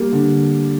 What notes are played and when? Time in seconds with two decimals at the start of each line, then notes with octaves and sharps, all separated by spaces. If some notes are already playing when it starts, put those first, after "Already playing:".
Already playing: G3 A#3 G4
0.12 D3